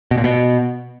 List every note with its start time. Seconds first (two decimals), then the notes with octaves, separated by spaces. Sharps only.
0.11 B2
0.18 A#2
0.24 B2